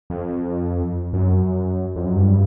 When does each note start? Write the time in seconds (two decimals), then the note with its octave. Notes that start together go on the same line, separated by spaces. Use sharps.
0.10 F2
1.13 F#2
1.96 F2
2.05 F#2
2.16 G2